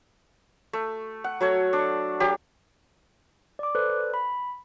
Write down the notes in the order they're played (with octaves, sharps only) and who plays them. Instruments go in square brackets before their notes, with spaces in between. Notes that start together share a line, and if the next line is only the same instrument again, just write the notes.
[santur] A3
F#5
F#3 A3 C#5
D4
F#3 G4
[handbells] D5 D6
A4 B4 C5 D5 F#6
B5